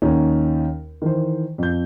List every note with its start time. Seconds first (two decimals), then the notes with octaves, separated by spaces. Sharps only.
0.02 D#2 C#4 D#4
1.02 D#3 E3 C5
1.58 F2 G6